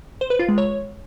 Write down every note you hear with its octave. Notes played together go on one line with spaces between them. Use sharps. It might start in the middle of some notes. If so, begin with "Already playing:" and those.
C5
B4
F4
G#3
C#5